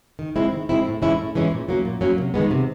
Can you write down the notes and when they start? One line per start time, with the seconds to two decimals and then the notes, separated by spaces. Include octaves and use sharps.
0.19 D#3
0.36 G#3 C4 E4
0.53 D#3
0.69 G#3 C4 E4
0.85 A2
1.02 E3 G#3 C#4 E4
1.18 A2
1.35 E3 G#3 C#4 E4
1.52 A#2
1.68 F#3 A#3 C#4
1.85 A#2
2.01 F#3 A#3 C#4
2.18 C3
2.34 D#3 G#3 B3
2.51 C3